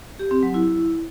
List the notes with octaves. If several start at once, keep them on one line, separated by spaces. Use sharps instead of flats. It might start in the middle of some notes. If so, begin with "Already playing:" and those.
G4
C4
F#3
E4